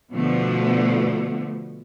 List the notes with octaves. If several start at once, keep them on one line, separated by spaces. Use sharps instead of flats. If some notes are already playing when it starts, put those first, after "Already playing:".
B2 D3 F3 A3 B3